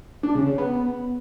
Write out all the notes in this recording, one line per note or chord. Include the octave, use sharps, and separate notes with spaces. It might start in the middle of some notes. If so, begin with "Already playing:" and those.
D4
C#3
C#3
B3